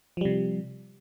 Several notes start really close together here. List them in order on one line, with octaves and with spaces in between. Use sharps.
F3 G3 C3